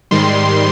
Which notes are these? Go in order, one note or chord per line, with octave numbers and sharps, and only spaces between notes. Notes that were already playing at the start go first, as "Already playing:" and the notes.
G#2 D#3 G3 C6